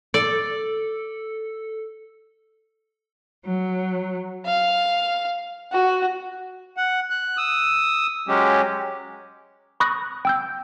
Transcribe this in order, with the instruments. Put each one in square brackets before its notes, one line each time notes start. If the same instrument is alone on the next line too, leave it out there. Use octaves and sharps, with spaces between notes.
[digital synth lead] A4 [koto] D5
[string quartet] F#3
F5
F#4
[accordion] F#5
F#6
D#6 E6
F#3 G#3 C#4 G4
[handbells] B5 C#6 D#6 F#6 A#6
G5 E6 G6